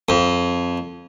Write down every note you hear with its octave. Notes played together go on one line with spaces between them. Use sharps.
F2